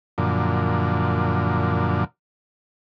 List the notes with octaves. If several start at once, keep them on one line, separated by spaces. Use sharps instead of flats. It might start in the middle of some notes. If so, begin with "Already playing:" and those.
F#2 A#2 D3 F3